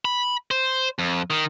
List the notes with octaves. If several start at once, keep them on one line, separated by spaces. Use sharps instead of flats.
B5
C5
F2
D#3